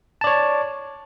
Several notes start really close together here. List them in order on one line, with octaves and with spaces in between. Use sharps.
A5 D5 C#5